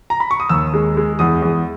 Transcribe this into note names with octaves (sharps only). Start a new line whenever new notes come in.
A#5
B5
C#6
D#6
D#2 E6
G#3
G#3
E2 D#6
E2